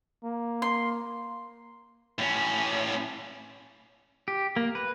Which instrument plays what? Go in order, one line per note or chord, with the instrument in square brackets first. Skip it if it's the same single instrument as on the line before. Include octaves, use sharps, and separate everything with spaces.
[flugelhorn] A#3
[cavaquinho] C6
[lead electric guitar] A2 C#4
[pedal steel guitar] G4
A#3
B4